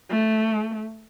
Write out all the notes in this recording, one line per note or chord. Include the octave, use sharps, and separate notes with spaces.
A3